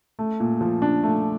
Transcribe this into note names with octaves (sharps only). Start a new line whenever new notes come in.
A3
A#2
F3
D4
A3